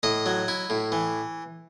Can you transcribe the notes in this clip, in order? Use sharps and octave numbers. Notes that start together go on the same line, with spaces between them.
A2 D#5
F#3
E4
A2
E3